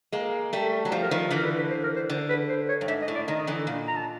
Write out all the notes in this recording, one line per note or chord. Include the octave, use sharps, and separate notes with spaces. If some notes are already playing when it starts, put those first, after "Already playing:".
G#3 A#3
G3 A3
F#3
F3 G3 C5
A#4
D#3 F3 B4
D3 E3 A#4
B4
B4
C5
A#4
C5
D3
B4
C5
C#5
G2
G#2 E5
D#5
A2
D5
D#3 D#5
D3 E3
A#2
A#5
A5